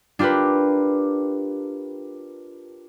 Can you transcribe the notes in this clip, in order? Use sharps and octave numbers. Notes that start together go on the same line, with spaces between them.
D4 F4 G4 A#4 B4